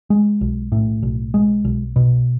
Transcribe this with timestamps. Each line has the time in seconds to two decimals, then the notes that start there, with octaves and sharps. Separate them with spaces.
0.10 G#3
0.41 B1
0.72 A2
1.03 B1
1.34 G#3
1.65 B1
1.96 B2